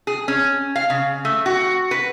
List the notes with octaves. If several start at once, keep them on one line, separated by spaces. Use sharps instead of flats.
G#4
C#4
F5
C#3
A3
F#4
B4